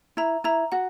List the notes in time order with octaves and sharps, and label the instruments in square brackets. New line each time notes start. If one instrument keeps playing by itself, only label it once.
[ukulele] E4 [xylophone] A#5
[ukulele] E4 [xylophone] A#5
[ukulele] F#4 [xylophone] F#5